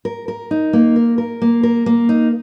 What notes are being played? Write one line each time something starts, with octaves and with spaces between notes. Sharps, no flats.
A#4
A#4
D#4
A#3
A#4
A#4
A#3
A#4
A#3
D#4